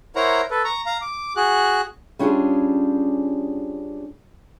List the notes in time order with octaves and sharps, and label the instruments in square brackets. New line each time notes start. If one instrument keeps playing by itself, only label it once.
[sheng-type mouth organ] E4 A#4 C5 C#5 F#5 A#5
A4 B4
A#5 C#6
F5 A#5
D6
F#4 G#4 F#6
[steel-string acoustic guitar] G3 C#4 D4 F4 G4 G#4